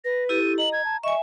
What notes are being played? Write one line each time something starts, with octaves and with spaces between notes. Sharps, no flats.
B4 A#6
E4 G4 A4 D#7
D#5 A#5 F#7
G#6
A5
D#5 E5 G#5 C#6